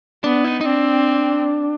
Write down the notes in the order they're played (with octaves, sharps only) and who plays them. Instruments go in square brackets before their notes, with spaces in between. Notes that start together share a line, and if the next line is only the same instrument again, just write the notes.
[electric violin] B3 [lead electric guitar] D4
[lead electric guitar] D#4
D#4
[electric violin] C4 [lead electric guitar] D4